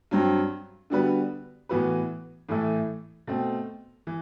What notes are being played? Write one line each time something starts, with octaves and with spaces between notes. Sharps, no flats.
G2 F#3 C4
D3 G3 B3 F#4 B4
A2 E3 B3 F#4 B4
A2 E3 A3 E4 A4
B2 A3 C4
E3